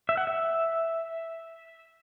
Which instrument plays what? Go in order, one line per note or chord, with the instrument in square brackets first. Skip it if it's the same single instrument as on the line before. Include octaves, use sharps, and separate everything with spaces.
[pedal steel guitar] E5
F#5
E5